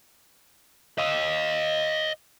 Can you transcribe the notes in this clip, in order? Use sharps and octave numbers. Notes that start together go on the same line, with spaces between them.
D#5 F5